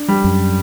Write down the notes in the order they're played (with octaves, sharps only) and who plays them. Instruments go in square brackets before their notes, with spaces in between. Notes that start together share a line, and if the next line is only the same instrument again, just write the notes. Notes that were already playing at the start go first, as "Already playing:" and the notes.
Already playing: [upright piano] D4
G3
[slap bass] F#2